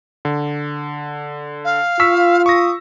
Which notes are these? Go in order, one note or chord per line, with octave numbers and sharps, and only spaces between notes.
D3
F5
F4 C#6 E6 B6
C#6 D#6 A#6